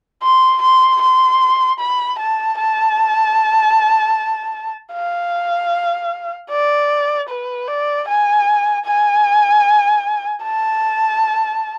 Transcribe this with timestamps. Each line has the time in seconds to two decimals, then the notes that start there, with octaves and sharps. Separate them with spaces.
0.23 C6
0.62 C6
1.02 C6
1.80 B5
2.19 A5
2.58 A5
4.93 F5
6.50 D5
7.29 B4
7.68 D5
8.08 G#5
8.85 G#5
10.44 A5